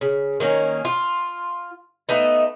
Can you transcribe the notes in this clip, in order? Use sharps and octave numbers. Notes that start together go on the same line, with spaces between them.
C#3
D#3 A#3 C#4 C#5
F4
A3 B3 D#4